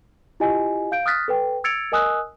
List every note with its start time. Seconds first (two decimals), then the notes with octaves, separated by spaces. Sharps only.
0.40 E4 F4 G4 D#5 G#5
0.92 F5 G6 D7
1.06 D#6 F6 F#6 A6 B6
1.28 A4 B4 G5
1.64 E6 G#6 A6 C#7 D7 F7
1.92 A#4 D#5 G#5 D#6 E6 F#6